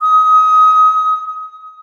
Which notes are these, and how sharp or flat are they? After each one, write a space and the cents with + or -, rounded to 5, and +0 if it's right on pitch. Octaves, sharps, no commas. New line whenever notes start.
D#6 +25